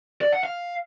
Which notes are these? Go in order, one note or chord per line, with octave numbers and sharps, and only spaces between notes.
D5
F#5
F5